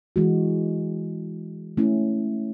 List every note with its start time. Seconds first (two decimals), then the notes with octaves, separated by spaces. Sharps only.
0.16 E3 G#3 F#4
1.77 A3 C#4 E4